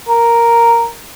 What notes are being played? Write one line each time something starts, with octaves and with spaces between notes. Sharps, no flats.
A#4